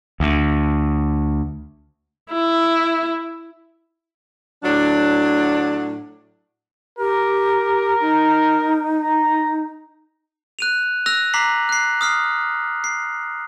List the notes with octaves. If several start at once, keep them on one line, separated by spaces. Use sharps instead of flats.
D2
E4
A2 F#3 D4
G4 A#4
D#4
A#5
F#6 D#7 F7
E6 F#6 A#6 F7
A#5 D6 B6 C7 F#7
F#6 C7
D#6 F6 C7
C7